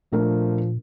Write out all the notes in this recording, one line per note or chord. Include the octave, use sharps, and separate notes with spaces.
A#2 F3 A3 D4 A#4